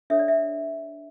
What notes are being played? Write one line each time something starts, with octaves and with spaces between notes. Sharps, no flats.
D4 A4 C#5 E5
D5
E5